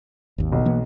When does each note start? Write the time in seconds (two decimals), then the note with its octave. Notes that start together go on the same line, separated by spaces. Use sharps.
0.38 G#1 D#2
0.52 B1
0.65 E3 A#3 B3